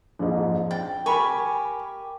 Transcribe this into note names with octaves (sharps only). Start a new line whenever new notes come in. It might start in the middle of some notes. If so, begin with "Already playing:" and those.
A#1 F2 G#2
G5 A6
G4 A#4 G#5 B5 C#6